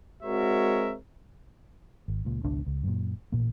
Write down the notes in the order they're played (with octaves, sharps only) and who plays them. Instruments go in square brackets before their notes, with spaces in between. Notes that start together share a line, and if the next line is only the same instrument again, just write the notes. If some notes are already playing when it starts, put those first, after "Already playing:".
[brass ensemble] G#3 C4 F#4 A#4 C#5 E5
[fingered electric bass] G#1
C#2 A#2
G#1 C#2 B2 D4
C#2
F#2 A#2
A1 A#2 A#3